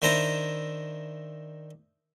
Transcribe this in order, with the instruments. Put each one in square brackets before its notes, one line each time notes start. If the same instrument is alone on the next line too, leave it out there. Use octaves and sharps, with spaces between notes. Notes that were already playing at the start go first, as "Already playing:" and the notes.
[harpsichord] D#3 D4 E4 C5 A#5 B5